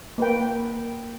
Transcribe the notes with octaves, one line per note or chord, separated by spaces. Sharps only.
A#3 B4 G5